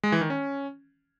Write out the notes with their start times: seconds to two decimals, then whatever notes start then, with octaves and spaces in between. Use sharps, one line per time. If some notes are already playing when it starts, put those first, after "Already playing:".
0.03 G#3
0.12 E3
0.21 D#3
0.30 C#4